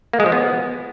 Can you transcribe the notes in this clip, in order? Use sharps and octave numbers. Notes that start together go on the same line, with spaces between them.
A#3
G#3
F3
B3